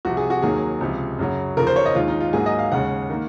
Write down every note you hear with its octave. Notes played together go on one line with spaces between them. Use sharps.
C2 C3 F3 F#4
G#4
F#4
D#2 D#3 F#3 A#3 G#4
C#2 C3 F3 G#3
F#2 C#3 F#3
D#2 C#3 F3 A#4
C5
C#5
D#5
D#2 D#3 G#3 F4
D#4
F4
G#2 F#3 A#3 G#4
D#5
F5
D#2 C#3 G#3 F#5
D#3 A#3